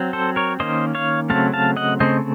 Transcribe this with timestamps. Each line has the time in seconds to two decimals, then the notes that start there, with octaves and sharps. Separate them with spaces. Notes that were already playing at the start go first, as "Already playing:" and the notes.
Already playing: F#3 C4
0.13 A4 C5
0.36 A#4 C#5
0.60 D#3 A#3 C#4 C5 D#5
0.95 C#5 F5
1.30 C#3 F#3 A3 C4 F5 A5
1.53 F5 A5
1.77 D#5 F#5
2.00 C#3 A3 C4 C5 D#5